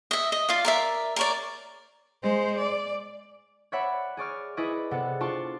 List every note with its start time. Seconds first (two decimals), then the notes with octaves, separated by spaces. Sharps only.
0.11 D#5 E5
0.32 D#5
0.49 F4 D5 F5
0.65 A#4 D5 E5
1.16 A#4 C#5 D5
2.22 G#3 C5
2.58 D5
3.72 C#5 D5 E5 F#5 B5
4.17 G#4 D5 C#6 F6
4.57 E4 G#4 B4 D5 D#5 C#6
4.91 C3 B3 A4 F#5
5.20 D4 F4 A4 A5 C6 C#6